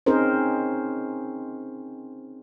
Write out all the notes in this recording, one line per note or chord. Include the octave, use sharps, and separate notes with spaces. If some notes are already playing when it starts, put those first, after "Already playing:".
C4 C#4 D#4 G#4 A#4 C5